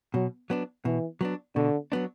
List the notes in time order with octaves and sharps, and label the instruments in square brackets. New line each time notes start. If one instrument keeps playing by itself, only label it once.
[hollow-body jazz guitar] B2 [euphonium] F#3
[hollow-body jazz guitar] F#3 B3 D4
[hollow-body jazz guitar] B2 [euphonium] E3
[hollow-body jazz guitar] F#3 B3 D4
[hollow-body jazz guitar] B2 [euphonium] D3
[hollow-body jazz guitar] F#3 B3 D4